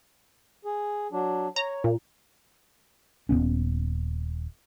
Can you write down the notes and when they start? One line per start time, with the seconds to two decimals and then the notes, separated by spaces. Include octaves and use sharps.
0.65 G#4
1.12 F#3 D4
1.56 C#5 A#5
1.84 A#2
3.29 D#1 B2 B3 C#4